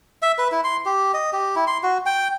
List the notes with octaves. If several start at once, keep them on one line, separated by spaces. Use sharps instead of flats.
E5
B4
E4
C6
G4
D#5
G4
E4
C6
F#4
G5